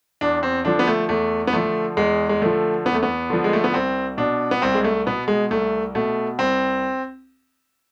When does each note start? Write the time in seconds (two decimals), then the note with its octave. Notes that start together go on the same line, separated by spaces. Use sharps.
0.21 E2 D4
0.43 C4
0.65 D3 F3 D4
0.79 B3
0.87 A3
1.09 E2 A3
1.47 B3
1.53 D3 F3 A3
1.97 E2 G#3
2.29 G#3
2.42 D3 F3 A3
2.85 E2 B3
2.94 A3
3.03 B3
3.30 D3 F3
3.44 G#3
3.53 A3
3.64 B3
3.74 C2 C4
4.17 B2 D4
4.51 B3
4.62 C2 C4
4.74 G#3
4.84 A3
5.06 B2 B3
5.28 G#3
5.50 C2 A3
5.95 B2 A3
6.39 C2 C4